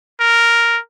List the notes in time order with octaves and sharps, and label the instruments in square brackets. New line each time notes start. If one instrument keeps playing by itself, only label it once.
[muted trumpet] A#4